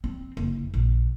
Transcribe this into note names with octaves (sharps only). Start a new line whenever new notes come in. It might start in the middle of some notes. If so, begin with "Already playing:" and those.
C4
F#1
A#1